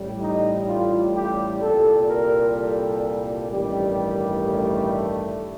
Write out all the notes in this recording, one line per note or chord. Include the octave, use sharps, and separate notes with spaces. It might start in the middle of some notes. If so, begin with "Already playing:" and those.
Already playing: A1 A2 G3
D#4
F4
G4
C2 A#2 G3 A4
A#4
A4
A1 G2 D#3 G3 G4
A3